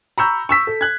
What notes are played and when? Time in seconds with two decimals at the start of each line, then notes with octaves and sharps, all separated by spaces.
0.18 A#5 B5 C#6 E6 G6
0.49 C#6 E6 B6
0.67 A4
0.81 F#6 G#6